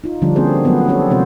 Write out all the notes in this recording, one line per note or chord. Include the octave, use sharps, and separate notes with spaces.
D#4 F4
D3 F3 G3 D4
A#3 C4 C#4 F#4 G#4 C5
F3 F#3 A3 B3
C#4 G4 A4 C#5
C3 F3 G#3 C4 F#4 C5